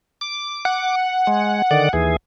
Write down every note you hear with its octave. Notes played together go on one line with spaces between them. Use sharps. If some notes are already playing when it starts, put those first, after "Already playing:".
D6
F#5
G#3
D3 D#3 D5
D#2 E3 G#4